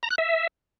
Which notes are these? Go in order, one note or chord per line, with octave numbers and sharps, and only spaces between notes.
A#5
F#6
E5